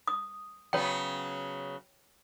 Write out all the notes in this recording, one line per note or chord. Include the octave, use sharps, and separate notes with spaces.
D#6
C#3 F#3 B3 C#5 G5